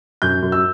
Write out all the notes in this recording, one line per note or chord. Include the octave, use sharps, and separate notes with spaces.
F#2 G6
F#2
E6